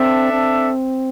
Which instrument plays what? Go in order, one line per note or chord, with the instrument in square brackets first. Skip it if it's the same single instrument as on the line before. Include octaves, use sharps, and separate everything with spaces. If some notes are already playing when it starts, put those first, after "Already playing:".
Already playing: [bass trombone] C4 [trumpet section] D4 A4 E5
[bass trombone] C4